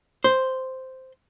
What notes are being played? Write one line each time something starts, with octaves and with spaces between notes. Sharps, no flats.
C5